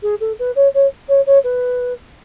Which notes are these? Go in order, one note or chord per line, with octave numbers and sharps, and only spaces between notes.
G#4
A4
B4
C#5
C#5
C#5
C#5
B4